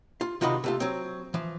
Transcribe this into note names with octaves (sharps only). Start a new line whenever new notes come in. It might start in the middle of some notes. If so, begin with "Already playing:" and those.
F4
C3 D#3 F4 F#4 D#5 B5
C3 A3 F4
F#3 C4
E3 F3